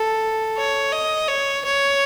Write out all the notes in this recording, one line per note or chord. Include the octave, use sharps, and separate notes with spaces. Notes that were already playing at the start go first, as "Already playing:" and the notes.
Already playing: A4
C#5
D#5
C#5
C#5